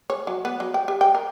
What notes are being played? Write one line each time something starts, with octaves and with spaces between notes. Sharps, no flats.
C#5
F#3
B3
F#3
G5
G4
G5
A#4